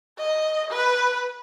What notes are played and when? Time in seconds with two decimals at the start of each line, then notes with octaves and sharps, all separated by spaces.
0.19 D#5
0.71 B4